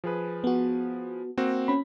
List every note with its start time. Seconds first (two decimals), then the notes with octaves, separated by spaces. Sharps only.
0.04 F3 G#4 B4
0.44 B3 F#4
1.37 A#3 C4 F#4
1.68 C#4 B5